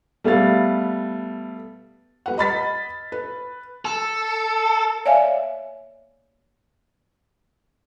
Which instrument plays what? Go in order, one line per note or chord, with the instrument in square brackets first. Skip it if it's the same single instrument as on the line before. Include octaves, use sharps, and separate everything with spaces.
[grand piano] G3 A3 B3 F5 A6
[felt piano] G3 B4 F#5
D#5 B5 A6 B6
B4
[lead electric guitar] A4
[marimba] C#5 D5 E5 F5 G#5